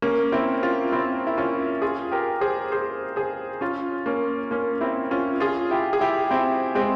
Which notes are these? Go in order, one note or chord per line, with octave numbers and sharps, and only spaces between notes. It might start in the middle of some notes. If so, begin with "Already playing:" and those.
A#3 C#4
C4 E4
C#4 F4
C4 E4
E4
C#4 F4
F4 G#4
G4 A#4
G#4 C5
G#4 C5
G#4 C5
C#4 F4
A#3 C#4
A#3 C#4
C4 E4
C#4 F4
F4 G#4
E4 G4
G#4
E4 G4
C4 E4
G#3 C4